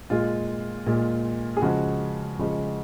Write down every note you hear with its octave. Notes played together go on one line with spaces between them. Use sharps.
A#2 G#3 F4
A#2 G#3
G#4
C#3 F3 G#3 F#4
C#3 F3 G#3